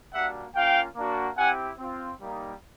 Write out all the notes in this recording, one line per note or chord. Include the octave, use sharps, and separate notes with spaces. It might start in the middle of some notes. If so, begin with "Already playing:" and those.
G3 A#3 D4 F#4 E5 F#5
A#3 C#4 F4 F5 G5
A#3 D4 F#4
C4 E4 G4 F#5 G#5
C4 F4
G3 A#3 D#4